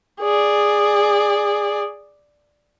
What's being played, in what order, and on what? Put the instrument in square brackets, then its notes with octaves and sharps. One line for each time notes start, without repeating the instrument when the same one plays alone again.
[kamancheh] G#4 D5